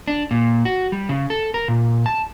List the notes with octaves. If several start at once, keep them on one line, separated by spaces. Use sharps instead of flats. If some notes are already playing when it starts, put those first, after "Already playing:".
D4
A#2
F#4
G3
C#3
A4
A#4
A#2
A5